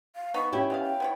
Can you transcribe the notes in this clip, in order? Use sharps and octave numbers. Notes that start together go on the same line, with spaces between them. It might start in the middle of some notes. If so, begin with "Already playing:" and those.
F5
B3 D#4 B5 C#6
C#4 E4 G4 G5
B3 D#5 F5 G#5
G5
B3 E4 C#5